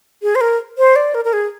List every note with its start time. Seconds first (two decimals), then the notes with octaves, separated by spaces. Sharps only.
0.22 G#4
0.35 C5
0.41 A#4
0.78 C5
0.96 D5
1.14 A#4
1.25 A#4
1.33 G#4